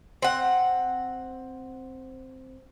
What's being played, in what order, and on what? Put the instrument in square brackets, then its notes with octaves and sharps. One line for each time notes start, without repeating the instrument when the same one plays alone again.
[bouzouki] C4 F#5